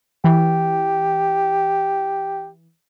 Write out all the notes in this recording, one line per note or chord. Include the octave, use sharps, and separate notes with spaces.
E3 G4